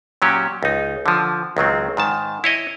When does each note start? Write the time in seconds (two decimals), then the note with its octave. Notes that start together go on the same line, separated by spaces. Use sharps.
0.22 A#2 F#3 C#4 G4
0.63 C#2 D#4
1.06 D3 F3
1.57 C#2 D#3 F#3 C4
1.97 G#2 D#3 A5
2.44 E4 C#5 D#5